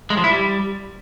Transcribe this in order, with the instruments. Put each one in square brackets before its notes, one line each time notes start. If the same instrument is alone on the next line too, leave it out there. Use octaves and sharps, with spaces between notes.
[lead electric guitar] G#3
F3
E4
G3